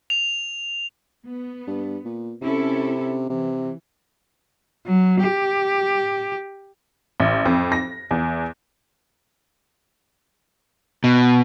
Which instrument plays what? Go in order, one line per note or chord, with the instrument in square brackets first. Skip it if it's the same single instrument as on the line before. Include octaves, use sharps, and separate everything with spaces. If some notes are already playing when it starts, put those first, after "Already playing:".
[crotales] F7
[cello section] B3
[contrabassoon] G2
A#2
[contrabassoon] C3 [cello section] C#4 E4 A4
[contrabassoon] C3 [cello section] E3
[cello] F#3
G4
[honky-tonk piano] A1
F2
A#6
E2
[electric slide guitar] B2